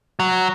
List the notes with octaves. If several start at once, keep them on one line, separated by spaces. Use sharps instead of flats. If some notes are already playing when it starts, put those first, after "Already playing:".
F#3